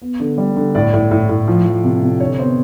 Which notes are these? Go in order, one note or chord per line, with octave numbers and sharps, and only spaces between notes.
B3
D3
G3
D3
A2 D5
A2
A2
A2
F3
F3
C3
C3
D3 C#5
B3 C5